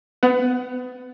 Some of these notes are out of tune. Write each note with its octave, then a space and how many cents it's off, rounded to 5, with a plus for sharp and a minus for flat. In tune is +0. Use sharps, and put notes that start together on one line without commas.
B3 +30 F#5 +10